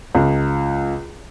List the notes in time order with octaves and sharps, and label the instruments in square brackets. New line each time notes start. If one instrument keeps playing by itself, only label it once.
[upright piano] C#2